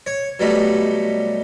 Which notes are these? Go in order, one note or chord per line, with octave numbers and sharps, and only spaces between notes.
C#5
B2 F#3 G3 A3 D#4